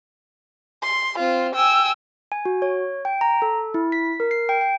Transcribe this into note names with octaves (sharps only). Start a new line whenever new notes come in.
C6
C4 F4
G5 G#5 E6
G#5
F#4
C#5
G5
A#5
A4
E4
B6
A#4
C7
G5
G5